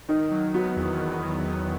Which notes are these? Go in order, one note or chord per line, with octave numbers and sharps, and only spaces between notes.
D#3 D#4
F#3
B3 F#4
E2
D#3
F#3
B3